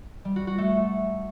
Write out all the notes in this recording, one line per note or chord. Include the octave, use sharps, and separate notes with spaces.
G3
F#4
F#4
A3